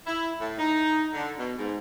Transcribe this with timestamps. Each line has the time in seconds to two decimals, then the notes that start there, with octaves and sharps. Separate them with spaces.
0.07 E4
0.41 A2
0.58 D#4
1.13 D3
1.39 B2
1.58 G#2